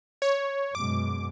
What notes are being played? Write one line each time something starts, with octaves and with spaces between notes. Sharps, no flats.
C#5
F#2 B2 G#3 D6